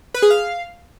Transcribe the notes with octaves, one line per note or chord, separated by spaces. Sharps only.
B4
G#4
F5